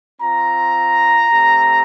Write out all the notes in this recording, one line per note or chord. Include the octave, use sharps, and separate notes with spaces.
C4 F4 A#5
A3 C4 G4